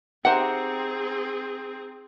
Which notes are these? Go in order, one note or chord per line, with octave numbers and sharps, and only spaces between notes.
C4 D#4 G4 G#4 C5 E5 F#5